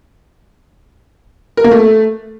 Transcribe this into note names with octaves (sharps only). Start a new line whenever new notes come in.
A#4
A#3
A3